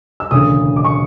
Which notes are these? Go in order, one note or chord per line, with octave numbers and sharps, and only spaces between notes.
E6
E1 D2 C#3 D#6
D6
C#6